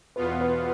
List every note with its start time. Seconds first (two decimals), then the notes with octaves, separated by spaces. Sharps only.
0.16 E2 B2 B3 F4 B4
0.41 B4